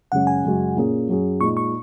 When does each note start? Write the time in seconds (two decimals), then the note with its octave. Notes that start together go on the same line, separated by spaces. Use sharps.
0.12 F#2 C#3 G#3 C#4 F#5
0.27 G#5
0.44 F#2 C#3 G#3 F#4
0.76 A#2 A#3 C#4 G#4
1.08 F#2 F#3 C#4 G#4
1.41 A#2 G#3 D#4 C#6
1.57 C#6